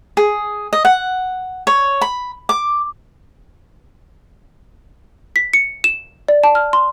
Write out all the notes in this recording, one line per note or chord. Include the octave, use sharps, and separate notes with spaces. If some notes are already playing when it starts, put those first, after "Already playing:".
G#4
D#5
F#5
C#5
B5
D6
B6
C#7
E7
D5
A5
F6
C6